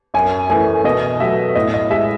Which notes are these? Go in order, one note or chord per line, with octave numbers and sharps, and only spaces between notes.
F#2 G#5
E3 A3 G#5
B2 D#5
F#3 A3 E5
A2 D#5
D#5
G#3 E5